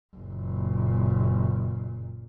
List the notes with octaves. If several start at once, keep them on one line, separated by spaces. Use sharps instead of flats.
F#1 A#2